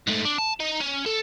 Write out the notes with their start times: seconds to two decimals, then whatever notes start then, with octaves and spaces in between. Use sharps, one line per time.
0.07 G#2 A3
0.25 D4
0.38 A5
0.60 D#4
0.80 C#4
1.06 A4